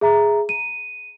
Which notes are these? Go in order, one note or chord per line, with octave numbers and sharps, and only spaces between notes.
G#4 E5 A#5
D#7